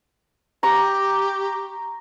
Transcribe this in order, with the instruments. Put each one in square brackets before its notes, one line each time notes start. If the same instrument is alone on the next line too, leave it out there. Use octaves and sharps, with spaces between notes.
[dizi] G4 [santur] A#5 C#6